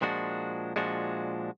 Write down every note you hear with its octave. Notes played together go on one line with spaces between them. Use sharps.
A#2 F3 G#3 D4 F#4
A#2 F3 G#3 D4 F#4